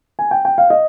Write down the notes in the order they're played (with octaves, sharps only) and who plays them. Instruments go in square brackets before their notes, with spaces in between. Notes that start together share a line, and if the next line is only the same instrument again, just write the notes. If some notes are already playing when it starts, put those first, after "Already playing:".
[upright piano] G#5
G5
G5
F5
D#5